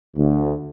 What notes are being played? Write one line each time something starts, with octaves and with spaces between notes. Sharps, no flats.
D2